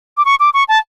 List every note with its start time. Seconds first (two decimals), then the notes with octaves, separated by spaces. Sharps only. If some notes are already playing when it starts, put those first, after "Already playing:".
0.17 D6
0.25 C#6
0.40 D6
0.54 C#6
0.69 A5